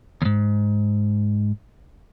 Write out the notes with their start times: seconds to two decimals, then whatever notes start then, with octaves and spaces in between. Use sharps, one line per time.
0.22 D#2 G#2